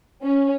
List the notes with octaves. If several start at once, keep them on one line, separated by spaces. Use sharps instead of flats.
C#4